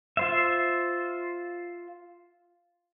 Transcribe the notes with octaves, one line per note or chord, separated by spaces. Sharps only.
F4 C5 E5